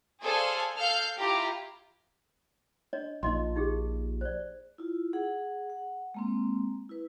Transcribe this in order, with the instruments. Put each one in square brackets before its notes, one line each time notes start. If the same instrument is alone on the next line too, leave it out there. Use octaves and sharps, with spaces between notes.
[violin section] G#4 A4 C5 D5 F5 G#5
A4 F5 F6 G6 C7
E4 F4 G4 A#5
[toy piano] D4 C#5 D#5
[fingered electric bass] A#1 A#2 [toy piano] D#4 D#5 C6
[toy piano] D#4 G4 G#4
C5 D5
[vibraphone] E4 F4
G#4 F#5
F#5
G#3 A#3 C4
E4 B4